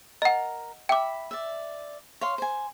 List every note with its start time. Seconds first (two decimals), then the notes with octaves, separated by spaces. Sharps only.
0.22 A#4 D#5 F#5
0.89 E5 G5 B5 D6
1.31 D5 E5
2.21 C#5 F5 C6
2.38 C5 G#5